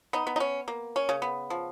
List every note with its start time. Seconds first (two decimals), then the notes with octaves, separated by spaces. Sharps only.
0.13 B3 D#4
0.27 B3
0.36 D#4
0.40 C#4
0.68 A#3
0.96 C#4
1.09 C#3
1.22 B3
1.50 F3